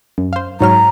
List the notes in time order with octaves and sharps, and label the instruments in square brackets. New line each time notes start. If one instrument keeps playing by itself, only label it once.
[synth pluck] F#2
C5 F5
[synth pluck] G#2 F#3 F6 [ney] A#5